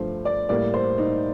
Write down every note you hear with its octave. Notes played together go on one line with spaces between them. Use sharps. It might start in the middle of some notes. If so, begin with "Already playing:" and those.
Already playing: G2 F3 A3 C5
D5
A2 G3 A#3 D5
C5
D#4